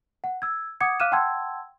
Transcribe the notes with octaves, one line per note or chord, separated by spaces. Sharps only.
F#5
E6 G#6
F#5 D6 D#6 G#6 C#7
F5 D6 F6 F#6 D#7 E7
F#5 G5 A5 C6 E6 G#6